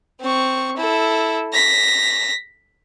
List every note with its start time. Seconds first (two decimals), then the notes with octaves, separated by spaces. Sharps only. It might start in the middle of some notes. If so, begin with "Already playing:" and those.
0.21 C4 C#6
0.77 E4 A4
1.53 A#6 B6